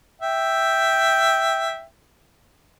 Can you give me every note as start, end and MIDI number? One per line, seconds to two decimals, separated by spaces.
0.22 1.83 76
0.22 1.83 79